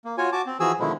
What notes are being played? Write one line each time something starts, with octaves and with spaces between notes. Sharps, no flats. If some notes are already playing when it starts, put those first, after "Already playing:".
A#3
F4 F#4 C#5 G#5
F#4 A5 D6
C4
E3 F3 F#4 G#4 G#5 E6
B2 D3 D#3 F3 G#3 E4